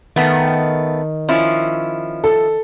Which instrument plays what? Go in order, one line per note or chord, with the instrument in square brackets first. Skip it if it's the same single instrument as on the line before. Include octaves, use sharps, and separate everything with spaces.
[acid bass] D#3 [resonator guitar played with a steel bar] A3 B3
[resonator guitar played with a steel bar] F3 C#4 E4
[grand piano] A4